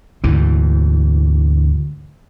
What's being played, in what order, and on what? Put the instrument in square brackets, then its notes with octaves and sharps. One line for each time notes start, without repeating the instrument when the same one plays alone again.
[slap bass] D2 G#2 E3